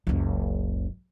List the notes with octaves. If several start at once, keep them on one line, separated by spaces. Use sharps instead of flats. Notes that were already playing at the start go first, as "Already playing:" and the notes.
F#1 C#2